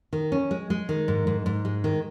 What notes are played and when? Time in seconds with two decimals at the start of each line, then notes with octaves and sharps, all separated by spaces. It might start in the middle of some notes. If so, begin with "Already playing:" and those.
0.13 D#3
0.32 C#4
0.51 G#3
0.70 G#3
0.89 D#3
1.08 G#2
1.27 G#2
1.46 G#2
1.65 G#3
1.84 D#3